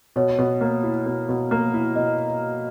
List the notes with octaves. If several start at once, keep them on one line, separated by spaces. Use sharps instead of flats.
B2 C#5
B2
A#3
E4
B2
B2
A#3
E4
B2 D#5